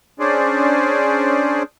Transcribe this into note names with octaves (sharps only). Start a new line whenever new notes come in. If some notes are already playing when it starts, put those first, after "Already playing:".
C#4 D4 G#4 C5 D5